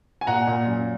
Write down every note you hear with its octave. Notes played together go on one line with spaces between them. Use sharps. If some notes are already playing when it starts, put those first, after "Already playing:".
G#5
A#2 F#5 A#5
A#2
F#2